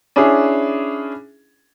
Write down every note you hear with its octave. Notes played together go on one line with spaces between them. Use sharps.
C#4 D4 E4 G#4